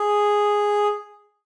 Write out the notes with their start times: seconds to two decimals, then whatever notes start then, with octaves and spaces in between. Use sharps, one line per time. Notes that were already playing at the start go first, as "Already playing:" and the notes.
Already playing: G#4